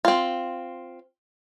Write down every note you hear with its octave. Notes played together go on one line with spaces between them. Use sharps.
C4 F4